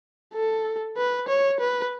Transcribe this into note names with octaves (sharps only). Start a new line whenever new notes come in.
A4
B4
C#5
B4